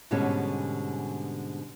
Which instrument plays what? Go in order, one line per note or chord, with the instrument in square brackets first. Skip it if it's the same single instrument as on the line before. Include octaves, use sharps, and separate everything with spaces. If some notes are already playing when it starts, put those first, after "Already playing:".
[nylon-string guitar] G#2 B2 D3 G3 C#4 G#4